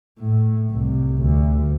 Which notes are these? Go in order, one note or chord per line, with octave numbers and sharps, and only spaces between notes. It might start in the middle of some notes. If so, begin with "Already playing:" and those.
A2
C2
D2